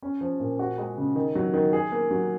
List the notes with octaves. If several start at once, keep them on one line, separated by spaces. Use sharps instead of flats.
C#4
F3
A#2
F#4
G#3
C#3
D#3
F#3
D#3
G#4
A#3
F#3